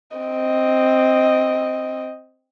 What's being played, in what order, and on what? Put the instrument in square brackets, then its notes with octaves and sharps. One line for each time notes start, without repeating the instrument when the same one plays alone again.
[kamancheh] C4 D#5